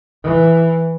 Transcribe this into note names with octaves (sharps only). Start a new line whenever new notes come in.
E3